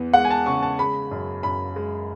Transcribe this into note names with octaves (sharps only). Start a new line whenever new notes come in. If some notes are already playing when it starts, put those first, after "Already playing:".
Already playing: E2 B3
G#3 F#5
G#5
A5
C#3 C#6
A5
G#3 B5
F#2
F#2 B5
G#3